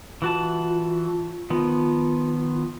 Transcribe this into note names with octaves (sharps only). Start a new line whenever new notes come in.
E3 F4 F#4 A5
D#3 F3 B3 F4